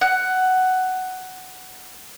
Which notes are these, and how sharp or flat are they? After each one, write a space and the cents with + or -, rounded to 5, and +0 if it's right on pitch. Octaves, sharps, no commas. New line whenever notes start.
F#5 +10